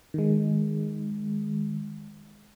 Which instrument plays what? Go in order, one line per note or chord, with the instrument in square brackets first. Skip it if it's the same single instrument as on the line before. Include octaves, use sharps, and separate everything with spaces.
[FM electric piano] D#3 G#3